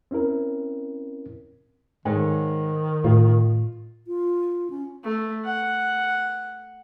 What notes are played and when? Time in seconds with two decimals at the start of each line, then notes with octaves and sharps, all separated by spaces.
0.11 C4 C#4 E4 A#4
2.05 G#2 D#3 C#5
3.04 A2 F4
4.07 F4
4.70 C#4
5.04 A3
5.45 F#5